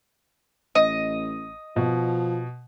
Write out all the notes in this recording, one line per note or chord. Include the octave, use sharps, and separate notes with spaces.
A1 D#5
B2 F3